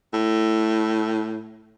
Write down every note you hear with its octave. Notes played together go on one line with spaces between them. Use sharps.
A2